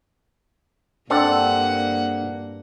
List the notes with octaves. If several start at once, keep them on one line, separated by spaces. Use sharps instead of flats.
G2 A#3 C4 D4 A4 F#5